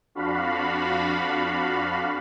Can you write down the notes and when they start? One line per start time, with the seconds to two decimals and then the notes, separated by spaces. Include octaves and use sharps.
0.15 F2 D4 F#4 F5 B5